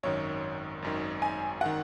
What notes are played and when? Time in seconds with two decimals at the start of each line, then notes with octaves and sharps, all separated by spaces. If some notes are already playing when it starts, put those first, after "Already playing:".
0.03 G#1 F#2 D#3 C#5
0.82 G#1 F#2 D#3
1.22 G#5
1.61 D#3 F#5